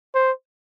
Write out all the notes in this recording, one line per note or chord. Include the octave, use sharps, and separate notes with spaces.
C5